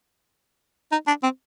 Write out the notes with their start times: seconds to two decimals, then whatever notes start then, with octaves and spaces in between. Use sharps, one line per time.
0.92 D#4
1.07 D4
1.23 C4